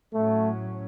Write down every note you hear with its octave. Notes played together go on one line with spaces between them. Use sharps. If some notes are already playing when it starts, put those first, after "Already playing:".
A2 F#3 A3 C#4